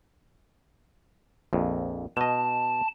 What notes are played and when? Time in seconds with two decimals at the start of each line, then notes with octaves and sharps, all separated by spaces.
1.53 A#1 F2
2.17 B2 D#5 A5